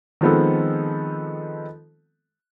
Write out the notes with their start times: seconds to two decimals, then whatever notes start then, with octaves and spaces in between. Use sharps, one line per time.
0.21 D#3 F3 G#3 B3 C4 A4